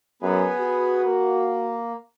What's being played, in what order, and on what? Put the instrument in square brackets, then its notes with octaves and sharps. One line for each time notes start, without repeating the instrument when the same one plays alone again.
[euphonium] F#2 [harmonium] B3 G#4 B4
[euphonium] F#4
[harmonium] A#3